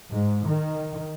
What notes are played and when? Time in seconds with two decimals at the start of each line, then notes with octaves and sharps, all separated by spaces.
0.10 G#2
0.47 D#3